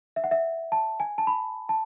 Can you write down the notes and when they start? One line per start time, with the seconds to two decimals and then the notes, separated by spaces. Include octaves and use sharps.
0.16 E5
0.24 F#5
0.31 E5
0.72 A5
1.00 G#5
1.18 A5
1.27 B5
1.69 A5